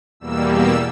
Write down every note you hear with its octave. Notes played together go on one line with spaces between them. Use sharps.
E2 B2 G3 A#3 E6
E6